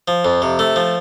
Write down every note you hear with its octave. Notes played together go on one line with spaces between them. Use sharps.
F3
F2
C3
A3
F3